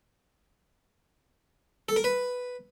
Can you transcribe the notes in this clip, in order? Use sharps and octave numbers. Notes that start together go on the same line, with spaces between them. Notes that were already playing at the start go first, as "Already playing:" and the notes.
A4
A#4
B4